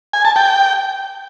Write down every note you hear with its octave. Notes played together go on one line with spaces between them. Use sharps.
G#5
A5
G5